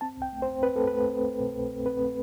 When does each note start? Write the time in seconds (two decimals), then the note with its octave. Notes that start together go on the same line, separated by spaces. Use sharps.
0.01 C4 A5
0.17 C2 G5
0.32 A3
0.42 C5
0.48 C4
0.63 C4 B4
0.76 A3 A4
0.87 B4
0.93 A3
1.09 C4
1.24 A3
1.40 B2
1.55 C2
1.70 C4
1.85 C4 B4
2.01 A3